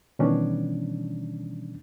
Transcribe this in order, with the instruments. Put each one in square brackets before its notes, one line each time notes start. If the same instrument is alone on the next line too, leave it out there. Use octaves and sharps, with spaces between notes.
[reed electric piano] B2 D#3 E3 G3 C#4 D4